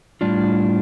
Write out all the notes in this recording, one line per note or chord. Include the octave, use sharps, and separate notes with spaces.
A2 G3 D4 F4